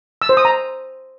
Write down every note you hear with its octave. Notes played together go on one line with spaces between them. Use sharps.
E6
C5
D#6
A#5